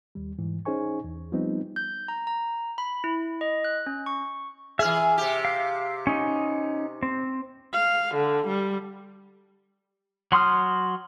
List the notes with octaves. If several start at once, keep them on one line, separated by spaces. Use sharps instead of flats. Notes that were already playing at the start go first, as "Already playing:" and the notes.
D#2 G3
G#2 E3
C#4 D#4 G#4 C5 G#5 C#6
E2
F3 G3 B3 C4 D#4
G6
A#5
A#5
B5
E4
D#5
F#6
C#4
C#6
E3 G#4 E5 F6
C3 G4
F5
C#4 D#4
C4
F5
D3
G3
F#3 C6 D#6 F6